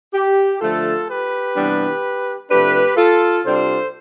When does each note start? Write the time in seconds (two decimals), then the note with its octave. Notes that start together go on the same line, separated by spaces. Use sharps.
0.13 G4
0.60 D3 F3 A3 F4 A4
1.08 G4 B4
1.55 C3 E3 G3 B3 D4
2.50 C3 F3 A3 D4 G4 B4
2.97 F4 A4
3.45 C3 G3 D4 F4 A4 C5